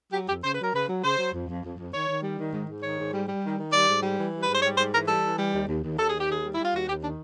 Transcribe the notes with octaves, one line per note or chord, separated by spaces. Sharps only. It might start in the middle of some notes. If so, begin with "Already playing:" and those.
F#3 G4
F2 G4
C#3 C5
B4
F#3 A#4
C#3 B4
F#3
C#3 C5
F#3
F2
F2
F2
F2
D#3 C#5
D#3
G3
D#3
G#2
G#2
D#3 C#5
G#2
G3
G3
D#3
D#3
G3 D5
G#2
G3
E3
G3
G#2 B4
C5
G3 C#5
G#2 C5
E3 A#4
G3 A4
E3
G3
D#2
D#2
D#2
D#2 A4
D#3 G#4
G4
D#2 G#4
G3
G3 E4
F4
D#2 F#4
D#2 G4
D#3 D4